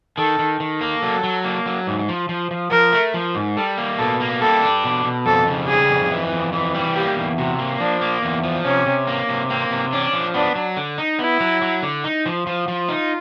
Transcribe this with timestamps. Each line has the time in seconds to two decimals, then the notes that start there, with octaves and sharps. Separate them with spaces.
0.17 D#3 A4
0.39 D#3
0.60 D#3
0.81 A#3
1.02 F#3 A4
1.24 F#3
1.44 A#3
1.66 F#3
1.87 G#2
2.08 F3
2.29 F3
2.51 F3
2.71 F3 A#4
2.93 A3
3.14 F3
3.35 G#2
3.56 G3 A4
3.78 A#3
3.98 B2 A4
4.20 A#3
4.41 G3 A4
4.63 D4
4.84 B2
5.05 B2
5.26 F2 A4
5.48 C#3
5.68 G3 G#4
5.90 F2
6.11 E3
6.32 F2
6.53 E3
6.74 G3
6.95 A#3 G4
7.17 E2
7.37 C3 F#4
7.59 A#3
7.80 F3 D4
8.01 A#3
8.22 E2
8.43 F3
8.65 C3 C#4
8.86 C3
9.07 A#3
9.29 C3
9.50 A#3 C4
9.71 C3
9.93 C#4 D4
10.13 F3
10.34 B3 D4
10.55 F#3
10.77 D3
10.98 D#4
11.19 B3 E4
11.40 F#3
11.62 F#3
11.83 D3
12.04 D#4
12.26 F3
12.47 F3
12.68 F3
12.89 D#4 F4